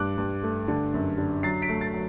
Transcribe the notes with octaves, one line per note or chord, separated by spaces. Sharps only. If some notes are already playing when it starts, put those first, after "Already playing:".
Already playing: G2 D6 F#6
G2
A3
D3
F#2
D3
F#3 A6 C7
B6 D7
A3
A6 C7
F#3